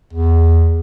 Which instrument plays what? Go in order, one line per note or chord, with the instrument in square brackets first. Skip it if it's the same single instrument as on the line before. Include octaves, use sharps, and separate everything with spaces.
[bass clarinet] E2